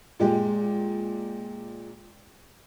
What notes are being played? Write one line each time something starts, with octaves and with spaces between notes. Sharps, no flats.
A#2 G#3 G4